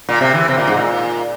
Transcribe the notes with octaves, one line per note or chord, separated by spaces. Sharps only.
A#2
C3
E3
C3
A#2
G#2
A#2